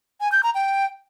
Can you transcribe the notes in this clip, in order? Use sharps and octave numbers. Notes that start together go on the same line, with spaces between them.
G#5
G6
A#5
G5